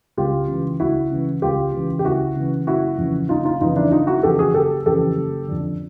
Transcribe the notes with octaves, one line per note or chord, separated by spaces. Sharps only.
C#2 F4 G4
C#3 E3
C#2 E4 F#4
C#3 E3
C#2 F4 G4
C#3 E3
G4
C#2 E4 F#4
C#3 E3
F#1 E4 F#4
F2 C#3 E3
F#1 D#4 F4
D#4 F4
F2 C#3 E3 D#4 F4
D4 E4
F#1 D#4 F4
E4 F#4
F2 C#3 E3 G4 A4
F#4 G#4
F#1 G4 A4
F2 C#3 E3 G4 A4
F#1
F2 D3